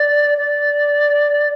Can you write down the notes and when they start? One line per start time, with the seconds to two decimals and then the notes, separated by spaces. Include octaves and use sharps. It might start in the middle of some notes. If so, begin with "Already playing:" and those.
Already playing: D5
0.38 D5